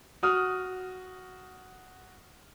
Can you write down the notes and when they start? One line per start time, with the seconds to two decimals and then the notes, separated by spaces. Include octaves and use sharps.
0.23 F#4 D#6 F6